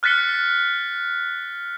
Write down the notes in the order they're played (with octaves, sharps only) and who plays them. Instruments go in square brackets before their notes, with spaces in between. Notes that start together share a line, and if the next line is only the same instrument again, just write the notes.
[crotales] F6 F#6 A6 B6 C#7 G7